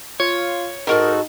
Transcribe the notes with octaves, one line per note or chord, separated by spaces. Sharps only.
F4 C#5
G#2 D#4 F#4 A4 A#4